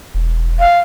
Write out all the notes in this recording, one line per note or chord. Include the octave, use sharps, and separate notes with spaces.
E1
F5